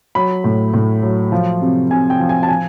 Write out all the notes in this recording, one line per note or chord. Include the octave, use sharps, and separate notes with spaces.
F#3 B5
A2
A2
F#3
F3
C3
C3 G#5
G5
F3
G#5
A5
F3 G#5